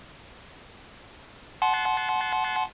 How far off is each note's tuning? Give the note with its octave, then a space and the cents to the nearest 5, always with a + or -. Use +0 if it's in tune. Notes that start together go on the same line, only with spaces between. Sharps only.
F#5 +0 A5 -30 C6 +0